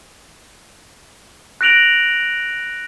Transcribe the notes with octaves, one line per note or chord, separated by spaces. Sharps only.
F#6 A#6 D7 F7 F#7